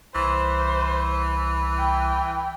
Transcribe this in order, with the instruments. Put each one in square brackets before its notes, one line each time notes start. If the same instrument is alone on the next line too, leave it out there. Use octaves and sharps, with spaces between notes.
[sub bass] C2 [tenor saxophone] E3 [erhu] C5
[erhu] G5